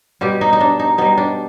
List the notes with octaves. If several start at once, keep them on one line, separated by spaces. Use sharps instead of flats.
B2 G3 G4
D#4
D#4
D4
D#4
B2 G3 D#4
D4